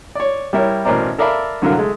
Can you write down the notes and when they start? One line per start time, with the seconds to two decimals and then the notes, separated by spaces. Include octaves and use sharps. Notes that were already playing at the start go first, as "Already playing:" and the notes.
0.15 C#5 D5
0.53 G3 E4 A#4 C#5
0.85 A1 B2 A#4 C5 D5 A#5
1.18 A4 A#4 D5 E5 F5 B5
1.62 C2 D3 F#3 A#4 F5
1.78 G#3 A3